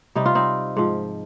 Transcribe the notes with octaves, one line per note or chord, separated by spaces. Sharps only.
C3 G3 D#4
F4
C4 D#4
G#2 F3